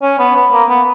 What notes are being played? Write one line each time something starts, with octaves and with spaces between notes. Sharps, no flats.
C#4
B3
B3
A#3
B3